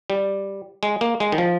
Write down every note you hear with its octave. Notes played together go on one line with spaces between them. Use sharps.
G3
G#3
A#3
G#3
D#3
F3